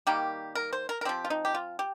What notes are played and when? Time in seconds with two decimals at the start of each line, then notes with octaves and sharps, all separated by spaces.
0.07 D#3 G3 A#3 G4
0.55 A#4
0.73 C5
0.89 A#4
1.01 A#4
1.05 F3 C4 G4
1.25 F4
1.30 D#4
1.45 G4
1.55 F4
1.79 G4